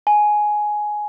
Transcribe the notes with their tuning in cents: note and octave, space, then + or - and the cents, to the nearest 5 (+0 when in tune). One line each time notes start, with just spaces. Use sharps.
G#5 +10